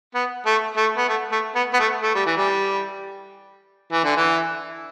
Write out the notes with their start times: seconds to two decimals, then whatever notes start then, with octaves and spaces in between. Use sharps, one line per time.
0.14 B3
0.46 A3
0.77 A3
0.97 B3
1.09 A3
1.32 A3
1.55 B3
1.74 B3
1.80 A3
2.02 A3
2.15 G3
2.26 E3
2.37 G3
3.92 E3
4.04 D3
4.17 E3